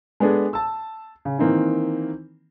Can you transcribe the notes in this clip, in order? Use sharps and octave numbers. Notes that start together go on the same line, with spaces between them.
G#3 B3 D4 G#4 A4
A5 E6
C#3
D#3 E3 A#3 C4 D#4 E4